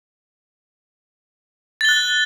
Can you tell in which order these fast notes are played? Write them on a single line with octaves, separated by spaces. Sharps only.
A6 G7 F#6